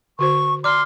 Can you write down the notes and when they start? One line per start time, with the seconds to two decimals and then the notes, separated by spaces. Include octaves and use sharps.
0.19 D3 F#4 C5 C#6
0.64 D5 A#5 C6 D6 F6